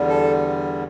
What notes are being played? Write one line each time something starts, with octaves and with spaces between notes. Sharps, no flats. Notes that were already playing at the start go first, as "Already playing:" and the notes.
Already playing: E2 D3 G3
A4